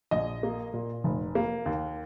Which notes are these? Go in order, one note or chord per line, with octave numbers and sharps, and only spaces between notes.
A#1 D#5
A#3
A#2
F1
A#3
D#2